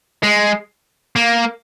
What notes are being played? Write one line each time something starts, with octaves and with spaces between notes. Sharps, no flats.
G#3
A#3